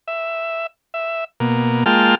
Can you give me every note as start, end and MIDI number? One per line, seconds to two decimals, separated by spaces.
0.08 0.67 76
0.94 1.24 76
1.40 1.84 47
1.40 1.84 58
1.86 2.15 56
1.86 2.15 58
1.86 2.15 65
1.86 2.15 79
1.86 2.15 81
1.86 2.15 89